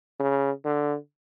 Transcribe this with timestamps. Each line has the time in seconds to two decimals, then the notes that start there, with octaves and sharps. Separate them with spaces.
0.20 C#3
0.65 D3